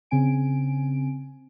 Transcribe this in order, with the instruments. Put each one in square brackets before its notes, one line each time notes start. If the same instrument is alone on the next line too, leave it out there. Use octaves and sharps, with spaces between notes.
[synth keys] C#3 C4 G#5 D7